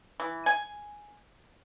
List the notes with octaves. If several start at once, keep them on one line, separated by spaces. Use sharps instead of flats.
E3
G#5